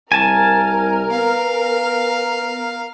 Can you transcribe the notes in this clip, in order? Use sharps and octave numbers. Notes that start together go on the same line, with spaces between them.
C2 A#4 G#5 A5
B3 F5